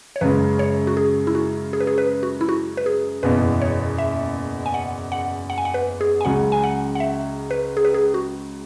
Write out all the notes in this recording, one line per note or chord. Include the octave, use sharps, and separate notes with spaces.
C#5
F#2 C#3 G#3 B4
C#5
F#4
G#4
E4
F#4
G#4
B4
G#4
B4
F#4
E4
F#4
B4
G#4
F#1 E2 B2 B4
C#5
E5
G#5
F#5
F#5
F#5
G#5
F#5
B4
G#4
G#5
C#2 C#3 F#3 F#5
G#5
F#5
F#5
E5
B4
G#4
B4
G#4
F#4